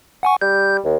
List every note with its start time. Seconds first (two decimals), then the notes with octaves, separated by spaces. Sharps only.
0.23 F#5 G#5 C#6
0.41 G3 G6
0.85 D#2